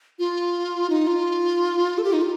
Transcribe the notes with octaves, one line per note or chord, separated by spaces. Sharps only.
F4
D#4
F4
A4
G4
D#4
F4